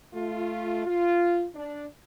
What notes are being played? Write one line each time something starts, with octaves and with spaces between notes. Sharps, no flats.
A3 F4
F4
D4